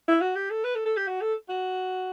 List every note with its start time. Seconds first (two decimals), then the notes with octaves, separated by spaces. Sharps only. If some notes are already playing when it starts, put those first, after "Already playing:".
0.08 E4
0.21 F#4
0.36 G4
0.50 A4
0.64 B4
0.75 A4
0.86 A4
0.97 G4
1.07 F#4
1.21 A4
1.49 F#4